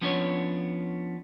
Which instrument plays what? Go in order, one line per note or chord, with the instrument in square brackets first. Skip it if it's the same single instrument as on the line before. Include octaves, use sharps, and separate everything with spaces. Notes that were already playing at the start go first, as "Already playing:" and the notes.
[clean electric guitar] F3 B3 C#4 D4 C#5